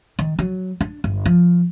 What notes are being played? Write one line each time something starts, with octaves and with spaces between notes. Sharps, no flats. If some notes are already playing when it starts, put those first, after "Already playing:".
D#3
F#3
D4
G1
F3